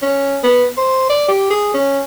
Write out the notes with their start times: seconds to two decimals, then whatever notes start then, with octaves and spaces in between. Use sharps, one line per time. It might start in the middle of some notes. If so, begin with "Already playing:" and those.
0.02 C#4
0.44 B3
0.77 C5
1.10 D5
1.28 G4
1.50 G#4
1.74 C#4